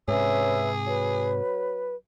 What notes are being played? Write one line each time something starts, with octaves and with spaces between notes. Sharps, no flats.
G#2 C3 C#4 G#4 B4 E5 E6
F#3 B4